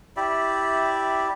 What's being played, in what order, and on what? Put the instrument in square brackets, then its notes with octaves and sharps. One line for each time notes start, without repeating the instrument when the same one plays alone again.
[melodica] E4 G4 D5 E5